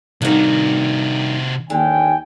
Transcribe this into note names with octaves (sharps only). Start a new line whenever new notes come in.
G2 C3 D#3 F#4
D#2 D3 G5 G#5